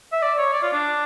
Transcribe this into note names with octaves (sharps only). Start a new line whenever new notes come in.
E5
D5
C#5
D5
F4
D4